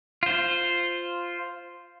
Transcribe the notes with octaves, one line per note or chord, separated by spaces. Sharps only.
F4 C5